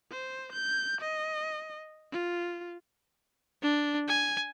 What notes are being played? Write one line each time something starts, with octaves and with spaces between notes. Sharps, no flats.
C5
G6
D#5
F4
D4
G#5